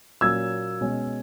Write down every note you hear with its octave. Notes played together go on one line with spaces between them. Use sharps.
A#2 F#3 A#3 C#4 E6 G#6
B2 G#3 C#4